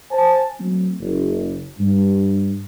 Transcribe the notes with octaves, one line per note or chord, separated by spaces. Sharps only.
C5 G#5 A5
F#3 A3 C4
F#1
G2